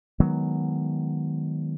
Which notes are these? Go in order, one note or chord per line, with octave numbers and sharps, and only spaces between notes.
D#3 F#3 G#3 B3